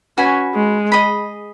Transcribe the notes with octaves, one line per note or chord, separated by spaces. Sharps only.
C#4 F#4 B4 G#5 B5
G#3
G#4 D#5 B5